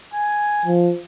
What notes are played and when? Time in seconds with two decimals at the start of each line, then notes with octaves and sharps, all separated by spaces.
0.14 G#5
0.65 F3